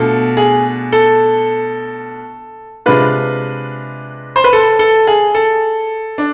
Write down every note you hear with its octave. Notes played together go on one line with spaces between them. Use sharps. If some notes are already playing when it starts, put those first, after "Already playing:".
Already playing: B2 A3 D4 F4 A4
G#4
A4
C3 G#3 D4 F4 B4
C5
B4
A4
A4
G#4
A4
D4